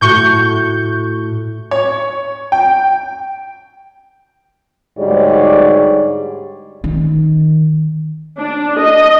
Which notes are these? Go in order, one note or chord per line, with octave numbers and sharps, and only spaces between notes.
A2 A3 F#4 C#6 G6
C#5
G5
D2 G#2 G3 G#4 C#5 D5
D#3
D4
D#5